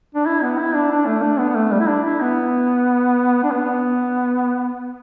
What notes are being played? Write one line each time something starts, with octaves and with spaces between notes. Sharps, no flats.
D4
E4
B3
E4
D4
D4
A3
D4
B3
B3
A3
G3
E4
D4
E4
B3
D4
B3